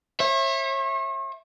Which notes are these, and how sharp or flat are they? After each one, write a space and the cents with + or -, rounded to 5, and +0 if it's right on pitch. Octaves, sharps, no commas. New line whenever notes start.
C#5 -45 E5 +0